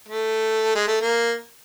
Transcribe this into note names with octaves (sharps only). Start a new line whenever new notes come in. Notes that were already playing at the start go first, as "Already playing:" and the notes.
A3
G#3
A3
A#3